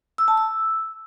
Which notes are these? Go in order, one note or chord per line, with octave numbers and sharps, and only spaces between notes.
E6
A5
E6